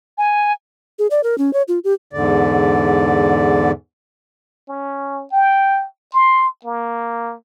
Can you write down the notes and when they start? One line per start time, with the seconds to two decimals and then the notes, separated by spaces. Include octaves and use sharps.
0.18 G#5
0.99 G#4
1.11 D5
1.24 A#4
1.38 C#4
1.53 C#5
1.68 F4
1.84 G4
2.13 E2 G#2 D3 D5
4.69 C#4
5.32 G5
6.13 C6
6.64 A#3